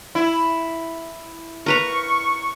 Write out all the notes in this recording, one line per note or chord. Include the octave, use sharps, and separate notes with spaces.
E4
A#4 B4 A#5 C#6